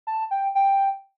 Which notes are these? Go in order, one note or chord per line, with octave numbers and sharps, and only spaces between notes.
A5
G5
G5